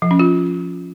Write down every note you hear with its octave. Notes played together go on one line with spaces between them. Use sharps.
F3
C#4
F4